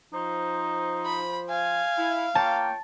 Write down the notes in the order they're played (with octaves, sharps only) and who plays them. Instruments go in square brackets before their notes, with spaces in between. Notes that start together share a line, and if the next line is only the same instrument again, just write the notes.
[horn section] F3 C5 [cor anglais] D#4
[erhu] B5
[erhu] F5 [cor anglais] G#5
[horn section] E4
[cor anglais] A#3 [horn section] F4 C#5 G5 [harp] A5